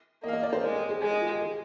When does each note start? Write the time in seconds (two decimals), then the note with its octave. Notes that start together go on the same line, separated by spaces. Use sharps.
0.23 A#3 D#5
0.28 F5
0.33 D#5
0.43 D5
0.53 C5
0.63 G#3 A#4
0.76 G4
0.89 G#4
1.02 G#3 G#4
1.12 D#4
1.21 F4
1.31 G4
1.41 G#4